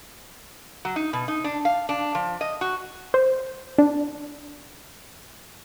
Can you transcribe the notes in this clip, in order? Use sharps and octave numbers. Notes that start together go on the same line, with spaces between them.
F#3
D#4
B2
D#4
D4
F5
D4
F3
D#5
F#4
C5
D4